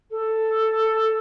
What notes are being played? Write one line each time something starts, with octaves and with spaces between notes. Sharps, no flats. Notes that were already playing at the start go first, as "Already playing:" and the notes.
A4